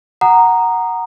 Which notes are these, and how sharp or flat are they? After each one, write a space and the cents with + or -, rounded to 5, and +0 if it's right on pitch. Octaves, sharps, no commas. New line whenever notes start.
F#5 +0 A#5 +0 D#6 -20